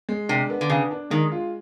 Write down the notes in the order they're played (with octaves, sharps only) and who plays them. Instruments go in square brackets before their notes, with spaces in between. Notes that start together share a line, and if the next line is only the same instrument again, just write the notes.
[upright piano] G#3
[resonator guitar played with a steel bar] C3 [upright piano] D4
[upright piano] B3
[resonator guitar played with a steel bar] D3
[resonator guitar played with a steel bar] C#3 [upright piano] D4
[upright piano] D4
[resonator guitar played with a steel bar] D#3 [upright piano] G#3
[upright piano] F4